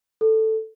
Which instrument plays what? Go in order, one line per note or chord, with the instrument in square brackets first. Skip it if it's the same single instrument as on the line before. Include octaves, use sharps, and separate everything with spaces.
[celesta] A4